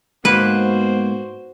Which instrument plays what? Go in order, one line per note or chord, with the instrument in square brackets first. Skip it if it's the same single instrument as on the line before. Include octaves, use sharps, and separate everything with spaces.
[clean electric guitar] G#2 A#3 [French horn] B3 [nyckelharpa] F#4 C5 [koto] B4